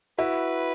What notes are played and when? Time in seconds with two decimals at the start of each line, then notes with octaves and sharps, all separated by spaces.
0.18 E4 F#4 B4